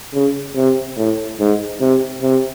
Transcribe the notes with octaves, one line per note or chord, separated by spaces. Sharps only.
C#3
C3
A2
G#2
C3
C3